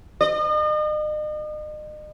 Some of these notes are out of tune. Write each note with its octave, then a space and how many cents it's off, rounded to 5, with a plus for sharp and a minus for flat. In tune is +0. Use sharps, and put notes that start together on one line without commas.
D#5 -40